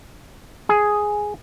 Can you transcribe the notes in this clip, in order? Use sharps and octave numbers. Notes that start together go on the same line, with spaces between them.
G#4